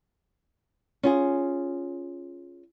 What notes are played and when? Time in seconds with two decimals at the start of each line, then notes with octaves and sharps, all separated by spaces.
1.03 C#4 F4 G#4